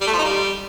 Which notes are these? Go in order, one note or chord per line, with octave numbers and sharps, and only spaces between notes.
G3
A3
F3
D#4
G3